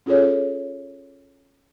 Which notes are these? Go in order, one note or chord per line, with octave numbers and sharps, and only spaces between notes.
C#4 F4 G#4 A4 C#5